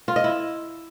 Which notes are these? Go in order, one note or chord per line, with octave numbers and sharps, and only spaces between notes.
F4
D#5
E4